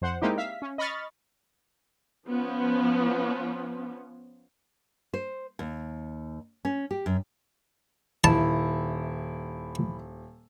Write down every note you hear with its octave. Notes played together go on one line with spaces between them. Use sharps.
F2 C5 F#5
G#3 A#3 C4 D#4 E4 G4
E5 F5 B6
C#4
D#5 B5 C#6 F6 A6
F3 B3 C#4
C5
D#2
C#4
G4
F#2
D#1 E4 A5